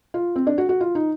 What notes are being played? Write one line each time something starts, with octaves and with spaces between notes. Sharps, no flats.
F4
C4
D4
F#4
F#4
F4
D#4